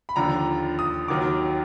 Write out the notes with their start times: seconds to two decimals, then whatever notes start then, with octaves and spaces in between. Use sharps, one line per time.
0.09 B5
0.16 D#2 D3 F3 A#5
0.79 D#6
1.08 D#2 D#3 F#3 D6